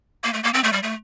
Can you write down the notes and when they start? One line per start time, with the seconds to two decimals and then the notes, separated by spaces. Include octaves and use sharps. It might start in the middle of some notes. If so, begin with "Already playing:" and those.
0.24 A#3
0.33 A3
0.43 A#3
0.54 C4
0.64 A3
0.73 G3
0.83 A3